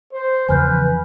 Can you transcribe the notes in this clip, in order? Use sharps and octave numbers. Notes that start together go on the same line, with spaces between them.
C5
E2 C#3 F3 B4 G#5 F6 G6